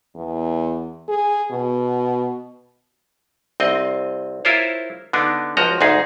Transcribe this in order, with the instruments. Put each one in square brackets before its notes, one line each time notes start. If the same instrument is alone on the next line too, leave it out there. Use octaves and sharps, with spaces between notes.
[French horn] E2
G#4
B2
[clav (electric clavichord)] C2 C4 D#5
E4 F4 A#4 C5 C#5
D3 B3 D4 D#4
C#2 F3 F#4 D#5 A#5
D2 G#2 D#4 G#4